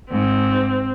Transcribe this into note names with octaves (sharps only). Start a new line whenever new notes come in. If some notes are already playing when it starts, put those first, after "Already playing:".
G#2 C4